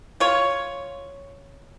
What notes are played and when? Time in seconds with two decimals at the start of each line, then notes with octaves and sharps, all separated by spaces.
0.20 F4 C#5